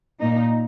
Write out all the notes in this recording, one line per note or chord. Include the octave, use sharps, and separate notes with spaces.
A#2 A#3 D#4